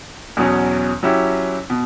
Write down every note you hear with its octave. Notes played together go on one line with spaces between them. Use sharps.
E2 B2 F#3 C#4
F#3 C#4 E4 G4
B2